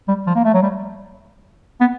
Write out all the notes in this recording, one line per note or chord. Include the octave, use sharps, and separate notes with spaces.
G3
F3
A#3
A3
F#3
G3
B3